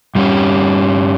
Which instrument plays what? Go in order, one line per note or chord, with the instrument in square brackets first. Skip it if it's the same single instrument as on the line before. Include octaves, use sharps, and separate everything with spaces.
[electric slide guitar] G2 G3 C#4